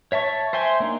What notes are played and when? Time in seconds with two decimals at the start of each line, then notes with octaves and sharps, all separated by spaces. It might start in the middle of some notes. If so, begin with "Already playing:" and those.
0.12 C#5 E5 A5 C#6
0.53 C5 E5 G5 G#5 C6
0.80 A#3 D4 D#4